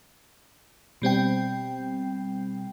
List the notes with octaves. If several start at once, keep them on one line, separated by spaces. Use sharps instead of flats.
B2 G3 C4 G5